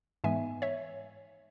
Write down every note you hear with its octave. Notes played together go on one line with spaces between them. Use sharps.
G#2 E3 G#3 B3 E5 G#5
C#5 E5